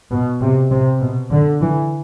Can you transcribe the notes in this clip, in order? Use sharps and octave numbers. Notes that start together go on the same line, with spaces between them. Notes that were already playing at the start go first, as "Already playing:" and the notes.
B2
C3
C3
B2
D3
E3